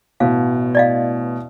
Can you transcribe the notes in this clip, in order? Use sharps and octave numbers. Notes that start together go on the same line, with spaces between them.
A1 B2 F5
D5 D#5 F5